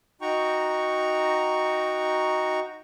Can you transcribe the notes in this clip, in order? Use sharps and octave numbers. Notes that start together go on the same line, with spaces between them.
D#4 F#4 G5 A#5 C#6